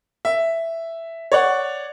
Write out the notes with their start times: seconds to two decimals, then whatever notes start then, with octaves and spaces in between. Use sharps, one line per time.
0.25 E5
1.32 C#5 D5 F#5